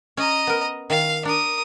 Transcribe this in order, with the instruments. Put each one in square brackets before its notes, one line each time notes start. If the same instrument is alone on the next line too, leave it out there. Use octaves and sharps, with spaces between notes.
[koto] C#4 [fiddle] D#5 A#5
[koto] B3 A#4
[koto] D#3 [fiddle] F5
[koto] D4 [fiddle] A#4 D#6